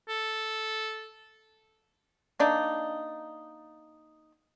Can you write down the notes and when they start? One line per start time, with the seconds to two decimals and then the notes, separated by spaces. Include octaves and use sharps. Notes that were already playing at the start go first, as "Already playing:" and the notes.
0.08 A4
2.39 A#3 D4 D#4